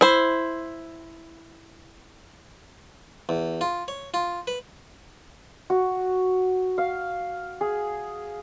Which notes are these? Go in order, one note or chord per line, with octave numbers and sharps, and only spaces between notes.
E4 C5
E2
F4
C#5
F4
B4
F#4
F5
G#4